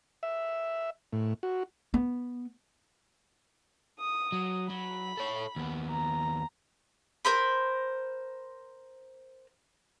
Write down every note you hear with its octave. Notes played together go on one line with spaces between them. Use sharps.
E5
A2
F#4
B3
D#6
F#3
F#3 B5
A4 C#5
D#2 B3
A#5
A#4 C5 B5